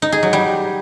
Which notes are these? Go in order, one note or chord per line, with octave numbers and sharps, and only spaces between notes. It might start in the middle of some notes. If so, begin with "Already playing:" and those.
D#4
G#4
F#3
G3